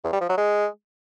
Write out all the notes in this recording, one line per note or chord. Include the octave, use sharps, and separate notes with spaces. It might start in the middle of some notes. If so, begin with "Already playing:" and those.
E2
G3
F3
F#3
G#3